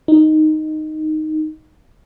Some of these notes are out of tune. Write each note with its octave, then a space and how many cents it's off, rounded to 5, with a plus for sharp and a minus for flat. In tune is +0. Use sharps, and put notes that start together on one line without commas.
D#4 -5